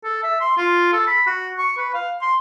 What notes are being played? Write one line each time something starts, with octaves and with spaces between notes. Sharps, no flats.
A4
E5
C6
F4
A4
B5
F#4
C#6
B4
F5
C6